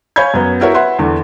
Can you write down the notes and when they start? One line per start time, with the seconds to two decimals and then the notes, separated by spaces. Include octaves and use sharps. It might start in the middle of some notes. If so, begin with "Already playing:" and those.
0.16 C#5 F5 G#5 B5 G6 G#6
0.34 F#2 B3
0.61 E4 F#4 A#4 B4 C#5 E5
0.74 B4 E5 F#5 C6
0.99 E2 D3